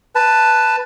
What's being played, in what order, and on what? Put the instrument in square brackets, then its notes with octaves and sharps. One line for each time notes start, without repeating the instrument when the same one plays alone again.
[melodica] B4 A5